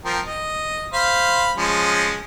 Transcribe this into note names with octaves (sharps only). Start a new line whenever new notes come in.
F3 C4 A#4
D#5
C5 F5 B5
F3 G#3 C#4